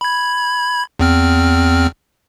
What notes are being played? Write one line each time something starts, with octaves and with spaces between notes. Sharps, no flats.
B5 G#6
E2 C4 F6